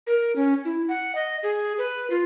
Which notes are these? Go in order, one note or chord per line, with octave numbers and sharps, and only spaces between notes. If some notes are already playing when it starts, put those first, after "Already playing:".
A#4
C#4
E4
F#5
D#5
G#4
B4
F4